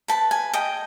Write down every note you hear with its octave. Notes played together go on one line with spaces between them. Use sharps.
B4 A5
G#5
D#5 G5